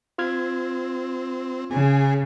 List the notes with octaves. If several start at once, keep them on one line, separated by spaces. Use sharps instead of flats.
C4 F4 F6 G#6
C#3 G#4